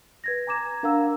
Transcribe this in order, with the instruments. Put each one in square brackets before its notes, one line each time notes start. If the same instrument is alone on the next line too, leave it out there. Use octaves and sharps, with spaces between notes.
[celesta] B4 G#6 A#6
G#5 A#5 D6 G#6 E7
D4 A#4 F5 F#5 A#5 E6